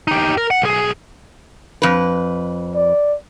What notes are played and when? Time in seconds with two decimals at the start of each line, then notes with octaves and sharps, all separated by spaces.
0.08 D#4 G4
0.37 A#4
0.51 F#5
0.62 B1 G#4
1.82 F2 B4
2.76 D5